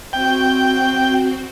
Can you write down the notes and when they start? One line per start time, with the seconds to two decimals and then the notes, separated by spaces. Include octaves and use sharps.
0.13 C4 F#4 G5